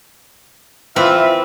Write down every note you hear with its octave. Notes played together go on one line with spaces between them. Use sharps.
E3 C4 F4 B4 E5